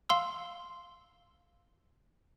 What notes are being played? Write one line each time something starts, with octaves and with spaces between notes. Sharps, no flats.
F5 C6 E6